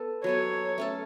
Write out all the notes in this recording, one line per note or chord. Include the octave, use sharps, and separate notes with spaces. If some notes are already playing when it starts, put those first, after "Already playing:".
Already playing: B3 A4
F#3 B3 A4 C#5
A3 C#4 A4